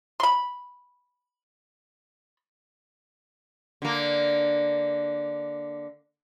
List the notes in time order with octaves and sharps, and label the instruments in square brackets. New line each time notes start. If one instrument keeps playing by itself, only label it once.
[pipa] B5 C6
[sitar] D3 A#3